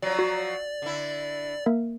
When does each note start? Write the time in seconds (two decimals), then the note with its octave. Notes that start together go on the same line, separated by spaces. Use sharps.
0.02 F3 F#3 D5
0.19 F#4
0.82 D3 E4
1.66 A#3 A#4 E5